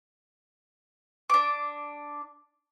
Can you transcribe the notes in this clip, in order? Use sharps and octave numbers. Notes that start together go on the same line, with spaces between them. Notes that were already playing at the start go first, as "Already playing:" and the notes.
D4 D6